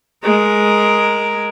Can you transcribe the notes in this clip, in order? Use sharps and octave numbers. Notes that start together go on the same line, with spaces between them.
G#3 A#4